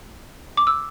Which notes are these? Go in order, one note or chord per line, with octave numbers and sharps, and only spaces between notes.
D6
E6